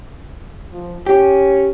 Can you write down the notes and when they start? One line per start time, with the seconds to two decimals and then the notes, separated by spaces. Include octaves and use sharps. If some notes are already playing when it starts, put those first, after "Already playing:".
0.71 F3
1.06 C#4 G4